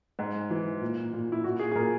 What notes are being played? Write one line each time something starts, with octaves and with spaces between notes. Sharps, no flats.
G#2
E3
A#2
A#2
E4
A#2 F#4
G#4
G#4
A#2 A#4